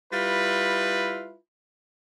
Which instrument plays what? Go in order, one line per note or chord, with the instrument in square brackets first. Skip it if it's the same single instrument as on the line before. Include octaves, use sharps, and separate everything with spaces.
[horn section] G3 E4 F4 B4